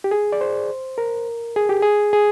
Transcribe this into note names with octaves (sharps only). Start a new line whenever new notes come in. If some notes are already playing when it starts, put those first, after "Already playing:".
G4
G#4
D5
C5
A#4
G#4
G4
G#4
G#4